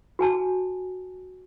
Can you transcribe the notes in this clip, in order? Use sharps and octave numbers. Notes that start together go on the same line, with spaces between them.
F#4 G#5 A5